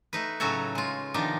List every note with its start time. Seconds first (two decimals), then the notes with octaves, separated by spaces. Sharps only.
0.13 A3 D#4 B4
0.40 A2 C#3 F#3 F#4 A4 C#5
0.75 G#3 F4
1.14 C3 D#3 F3 B3 D4 D#4